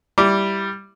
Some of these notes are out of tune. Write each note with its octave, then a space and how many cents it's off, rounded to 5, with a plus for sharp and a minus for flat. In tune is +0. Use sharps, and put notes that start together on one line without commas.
G3 +0 E4 +0 D6 -15